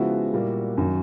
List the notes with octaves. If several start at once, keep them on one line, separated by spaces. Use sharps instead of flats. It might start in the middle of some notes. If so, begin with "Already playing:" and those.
Already playing: C#3 F3 G#3 B3 E4 F#4
A#2 G3 A#3
F#2 D#3 F#3